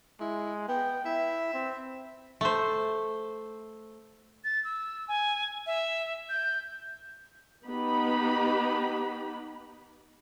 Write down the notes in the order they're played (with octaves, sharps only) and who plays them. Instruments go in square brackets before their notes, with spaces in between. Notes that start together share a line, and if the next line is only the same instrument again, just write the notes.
[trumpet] G#3 [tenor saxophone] E4
[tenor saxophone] B3 [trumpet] G5
[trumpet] E4 [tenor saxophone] E5
[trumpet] C4
[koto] A3 C5
[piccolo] A6
E6
G#5
E5
G6
[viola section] B3 D#4 G4 B5